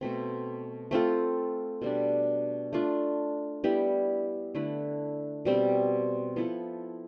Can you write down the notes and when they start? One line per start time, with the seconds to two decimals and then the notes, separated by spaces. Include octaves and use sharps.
0.01 B2 A3 C4
0.91 A3 C4 F4 A4
1.82 B2 G3 D4
2.73 A3 D4 F4
3.64 G3 B3 E4 G4
4.55 D3 A3 E4 B4
5.45 B2 G3 C4
6.36 F3 B3 E4 A4